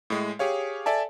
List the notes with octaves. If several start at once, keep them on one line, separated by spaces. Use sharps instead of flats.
A2 G#3
G4 G#4 C#5 F5
A4 D5 E5 G#5 A5